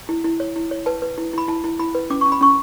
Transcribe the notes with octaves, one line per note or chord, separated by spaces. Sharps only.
E4
E4
C#5
E4
C#5
B4 A5
B4
E4
E4 B5
E4 A5
E4
E4 B5
B4
C#4 D6
C#4 C#6
B5
C#4 C#6